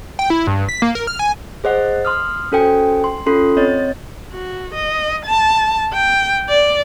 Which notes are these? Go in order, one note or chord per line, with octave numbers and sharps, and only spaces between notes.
G5
E4
G2
B6
A#3
A#4
F6
G#5
G#4 C5 D#5 F#5
C6 D#6 F6
C#4 F#4 A4 C5 G5 G#5
C6
C#4 F4 A4 C6 C7
C4 C#5 D#5 A6
F#4
D#5
A5
G5
D5